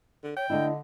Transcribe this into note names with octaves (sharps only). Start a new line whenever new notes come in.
D3
C#5 G5
D3 A3 D4 E4 D#5